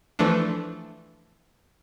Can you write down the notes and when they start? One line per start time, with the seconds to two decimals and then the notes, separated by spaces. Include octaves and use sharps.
0.19 E3 F3 A3 D4